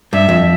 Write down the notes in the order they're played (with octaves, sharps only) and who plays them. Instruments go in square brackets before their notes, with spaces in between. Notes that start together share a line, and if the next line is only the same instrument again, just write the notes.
[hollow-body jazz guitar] G2 [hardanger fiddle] E5
[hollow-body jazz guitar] F2